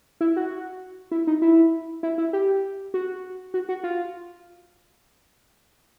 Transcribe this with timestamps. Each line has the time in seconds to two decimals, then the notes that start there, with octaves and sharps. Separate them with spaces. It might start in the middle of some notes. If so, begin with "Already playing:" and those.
0.21 E4
0.36 F#4
1.11 E4
1.27 D#4
1.42 E4
2.03 E4
2.18 E4
2.33 G4
2.94 F#4
3.54 F#4
3.69 F#4
3.84 F4